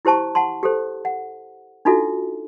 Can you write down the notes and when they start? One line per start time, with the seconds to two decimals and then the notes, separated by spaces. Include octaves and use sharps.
0.05 E4 G4 C5 A5 C#6
0.35 F#5 A5 C6
0.63 G4 A4 C5
1.05 F#5
1.85 D4 D#4 F4 F#4 A4 E5